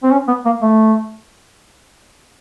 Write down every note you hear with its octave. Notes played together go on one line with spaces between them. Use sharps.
C4
C#4
B3
A#3
A3